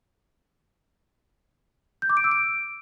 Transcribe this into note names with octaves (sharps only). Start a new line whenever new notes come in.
G6
D6
D7
E6
D7